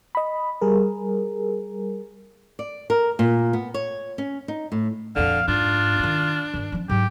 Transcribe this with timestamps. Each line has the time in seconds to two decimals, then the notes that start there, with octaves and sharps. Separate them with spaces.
0.15 D#5 B5
0.61 G3 G#4 A#4
2.59 D5
2.90 A#4
3.19 A#2
3.53 B3
3.74 C#5
4.18 C#4
4.48 D#4
4.72 A2
5.16 F2 A#2 D3 F5
5.48 G#2 D4 F4
5.99 D#3 E4
6.54 G2 D#3
6.72 F3 C#4
6.89 G#2 F#3 G4